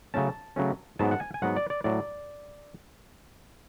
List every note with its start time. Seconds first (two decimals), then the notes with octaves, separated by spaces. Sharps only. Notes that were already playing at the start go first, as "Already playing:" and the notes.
0.14 C#3 F#3 A3 C#4 A5
0.56 C#3 F#3 A3 C#4
0.99 G#2 F#3 B3 A5
1.11 F#5
1.20 G#5
1.34 G#5
1.42 G#2 F#3 B3 F#5
1.56 D5
1.70 D5
1.84 A2 F#3 D5